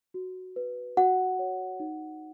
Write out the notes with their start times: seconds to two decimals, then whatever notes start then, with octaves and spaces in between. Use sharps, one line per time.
0.14 F#4
0.56 B4
0.97 F#4 F#5
1.39 C#5
1.80 D#4